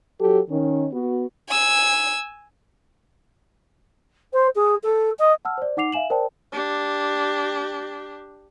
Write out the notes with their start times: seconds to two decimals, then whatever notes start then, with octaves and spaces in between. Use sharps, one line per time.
0.20 F#3 G4 A4
0.49 D#3 C#4
0.92 B3 F#4
1.49 G#5 E6
4.33 C5
4.55 G#4
4.83 A4
5.18 D#5
5.45 F#5 A5 E6 F6
5.58 C5 D5
5.77 D#4 F#5 D6 C7 F7
5.93 E5 F5 G#5 E7 F#7
6.10 A#4 C5 D5 G5 A5
6.53 D4 G4